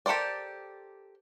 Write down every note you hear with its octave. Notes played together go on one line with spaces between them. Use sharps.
G4 A4 A#4 C5 D5